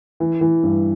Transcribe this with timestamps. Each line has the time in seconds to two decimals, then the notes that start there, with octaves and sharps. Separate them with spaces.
0.20 E3
0.41 E3
0.63 G2